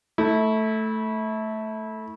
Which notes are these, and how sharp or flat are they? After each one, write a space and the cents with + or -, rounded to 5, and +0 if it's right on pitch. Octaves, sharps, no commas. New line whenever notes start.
A3 +0 E4 -25